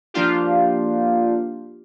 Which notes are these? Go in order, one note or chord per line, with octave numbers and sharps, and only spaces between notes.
F3 A#3 D4 F4 G4